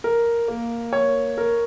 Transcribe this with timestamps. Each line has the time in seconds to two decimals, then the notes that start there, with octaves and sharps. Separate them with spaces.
0.04 A#4
0.48 A#3
0.93 C#5
1.38 A#4